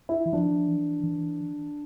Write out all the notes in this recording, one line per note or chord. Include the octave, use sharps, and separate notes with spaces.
E4
E3
F3 D4
E3
E3